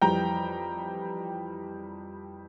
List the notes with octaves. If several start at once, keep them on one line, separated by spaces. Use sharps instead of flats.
F2 E3 G3 G5 A#5